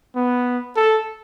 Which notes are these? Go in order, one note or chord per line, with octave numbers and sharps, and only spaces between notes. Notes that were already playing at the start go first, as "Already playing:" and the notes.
B3
A4